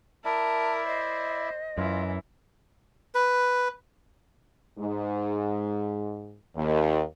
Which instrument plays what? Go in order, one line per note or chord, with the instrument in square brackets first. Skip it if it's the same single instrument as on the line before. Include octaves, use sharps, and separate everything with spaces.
[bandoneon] E4 D5 E5 [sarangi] A#4 [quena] A5
[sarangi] C5 [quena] D#5
[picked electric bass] F#2 [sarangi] E3 [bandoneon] F4
[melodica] B4
[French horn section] G#2
D#2